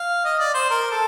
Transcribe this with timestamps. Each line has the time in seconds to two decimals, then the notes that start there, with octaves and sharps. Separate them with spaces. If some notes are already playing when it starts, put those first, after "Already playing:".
Already playing: F5
0.25 D#5
0.40 D5
0.54 C5
0.70 A#4
0.92 A4